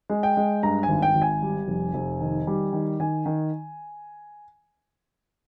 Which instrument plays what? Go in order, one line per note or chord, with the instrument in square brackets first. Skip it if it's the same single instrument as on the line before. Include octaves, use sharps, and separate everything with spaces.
[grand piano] G#3
G5
G#3
G2 A#5
G#5
G#1
G5
G#1
G#5
G3
F1
F1
D#3
G3
D#3
D#3 G#5
D#3